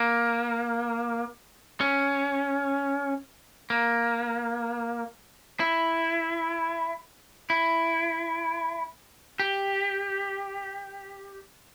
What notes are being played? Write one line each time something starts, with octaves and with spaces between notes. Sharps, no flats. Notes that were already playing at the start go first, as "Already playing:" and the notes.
Already playing: A#3
C#4
A#3
E4
E4
G4